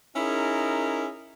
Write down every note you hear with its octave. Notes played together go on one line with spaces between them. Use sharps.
C#4 D#4 E4 G#4 A#4